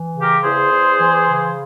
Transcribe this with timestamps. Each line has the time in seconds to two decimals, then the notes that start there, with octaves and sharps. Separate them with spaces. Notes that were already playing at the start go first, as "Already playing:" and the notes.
Already playing: E3
0.14 C#3
0.21 G4 A#4
0.42 E2 G#4 C5
0.71 E2
0.99 E3
1.27 C#3